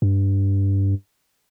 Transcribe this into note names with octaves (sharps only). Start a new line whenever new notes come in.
G2